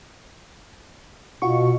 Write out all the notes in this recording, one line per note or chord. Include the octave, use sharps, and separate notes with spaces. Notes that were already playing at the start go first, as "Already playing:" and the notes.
B2 F4 F#4 C#6